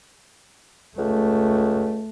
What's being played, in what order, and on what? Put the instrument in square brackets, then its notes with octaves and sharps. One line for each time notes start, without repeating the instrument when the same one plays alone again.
[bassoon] C#2 [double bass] A3